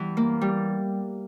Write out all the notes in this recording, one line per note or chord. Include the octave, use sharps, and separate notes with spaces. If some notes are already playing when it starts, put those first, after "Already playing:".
Already playing: E2 E3 G3
A#3
G3